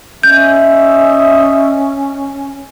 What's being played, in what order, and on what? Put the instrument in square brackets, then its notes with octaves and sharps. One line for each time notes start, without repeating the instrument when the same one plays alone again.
[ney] C#4 [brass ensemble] D#5 E5 [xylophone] G6